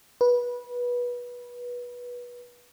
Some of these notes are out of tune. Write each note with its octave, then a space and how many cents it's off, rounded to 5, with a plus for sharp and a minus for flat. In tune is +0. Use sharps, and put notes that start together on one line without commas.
B4 -20